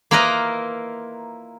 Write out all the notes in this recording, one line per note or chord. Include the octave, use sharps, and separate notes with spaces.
A#3 E4 F4 A#4 B4 D#5